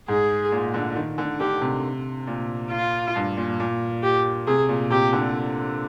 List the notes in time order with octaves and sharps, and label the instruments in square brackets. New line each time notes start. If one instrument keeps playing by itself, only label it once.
[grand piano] G#2 [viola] G#4
[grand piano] A#2
D3
D#3
D3
[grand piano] D3 [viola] G4
[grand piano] C3
A#2
[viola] F4
[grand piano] G2
A#2
A#2
[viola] G4
[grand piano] C3 [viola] G#4
[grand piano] A#2
[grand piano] C3 [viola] G4
[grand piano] D3